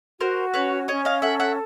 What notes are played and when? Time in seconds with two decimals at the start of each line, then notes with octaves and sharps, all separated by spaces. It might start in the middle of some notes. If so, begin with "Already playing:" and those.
0.19 F#4 A#4 C5
0.54 C#4 B4 C#5
0.88 C#4 C#5 D#5
1.05 D#5 F5
1.22 A4 E5 F#5
1.40 E5 F#5